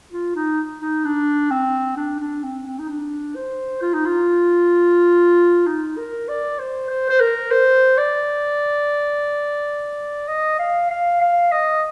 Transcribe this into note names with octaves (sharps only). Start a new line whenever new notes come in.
F4
D#4
D#4
D4
C4
D4
D4
C4
C4
D#4
D4
C5
F4
D#4
F4
D#4
A#4
D5
C5
C5
C5
A#4
C5
D5
D#5
F5
F5
F5
D#5